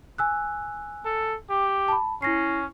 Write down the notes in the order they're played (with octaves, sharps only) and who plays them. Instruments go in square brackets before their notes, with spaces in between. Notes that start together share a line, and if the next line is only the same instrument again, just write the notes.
[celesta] G#5 E6 F#6
[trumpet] A4
G4
[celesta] A5 B5
[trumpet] C#4 [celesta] E4 A#6 C7